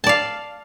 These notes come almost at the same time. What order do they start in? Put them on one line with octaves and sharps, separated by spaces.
A5 D5 F5